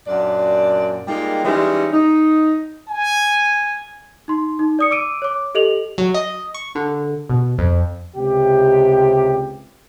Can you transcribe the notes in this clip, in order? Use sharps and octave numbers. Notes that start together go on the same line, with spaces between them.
F#2 A#2 D4 D5
G3 G#3 A#3 D#4 F4
E3 G3 G#3 C#4 D#4
D#4
G#5
D#4 C6
D#4
D5 D#6 C#7
D6 E6 D7 D#7
C#5 D6
G4 A4 D#5 F7 F#7
F#3
D#5
C#6
D3
B2
F2
C#2 C3 G4